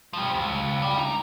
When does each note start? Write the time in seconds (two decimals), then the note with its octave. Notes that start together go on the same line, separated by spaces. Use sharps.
0.13 F3 G3
0.34 C#2
0.82 G3
0.98 D#4 A#5